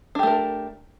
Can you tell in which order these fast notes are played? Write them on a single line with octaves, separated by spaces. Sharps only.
D4 G4 A3 A#4